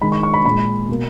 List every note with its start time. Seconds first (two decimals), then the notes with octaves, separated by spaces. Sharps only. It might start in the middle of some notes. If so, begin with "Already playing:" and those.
0.01 D#3 G#3 B5
0.12 C#6
0.23 C#6
0.34 B5
0.45 A#2 G#3 B5
0.88 B2 A#3